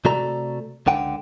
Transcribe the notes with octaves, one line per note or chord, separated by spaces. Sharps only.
C3 A3 F#4 A4 D5 A#5
C#2 D3 F#5 G5